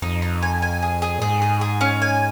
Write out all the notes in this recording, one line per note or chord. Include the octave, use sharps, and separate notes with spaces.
F2 D#4
D#4
G#5
G#5
G#4
G#4
A#2
G#2 G#4
G#4
G#4
C#4
G#5